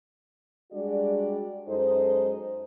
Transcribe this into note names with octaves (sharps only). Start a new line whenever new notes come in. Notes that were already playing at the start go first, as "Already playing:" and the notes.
G3 G#3 D4 F#4 D5
F#2 G#3 D#4 A4 C5